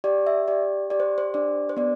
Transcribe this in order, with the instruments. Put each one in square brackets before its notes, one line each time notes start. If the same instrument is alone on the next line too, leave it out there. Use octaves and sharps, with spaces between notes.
[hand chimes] G4 D5
E5
G4 D5
G4 D5
C5
C5
D4 D5
C5
B3 D5